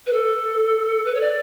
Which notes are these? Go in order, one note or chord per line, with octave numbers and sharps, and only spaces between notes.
B4
A4
B4
C#5
D5